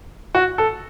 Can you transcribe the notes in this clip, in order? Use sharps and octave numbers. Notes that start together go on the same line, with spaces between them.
F#4
A4